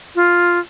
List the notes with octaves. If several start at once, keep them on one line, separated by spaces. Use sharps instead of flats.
F4